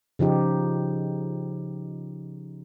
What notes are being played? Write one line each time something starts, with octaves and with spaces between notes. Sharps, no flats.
C#3 F3 D#4 G4